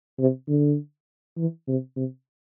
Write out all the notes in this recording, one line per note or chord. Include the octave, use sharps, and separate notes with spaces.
C3
D3
E3
C3
C3